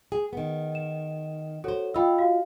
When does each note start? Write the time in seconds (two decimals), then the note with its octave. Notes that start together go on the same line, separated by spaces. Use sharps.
0.12 G#4
0.33 D#3 B3
0.75 E7
1.64 F#4 A4 C5 C#5
1.94 F4 D#5 G5 B5 E6
2.19 F#4 F5